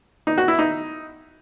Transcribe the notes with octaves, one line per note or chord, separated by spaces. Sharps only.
D#4
F#4
E4
D#4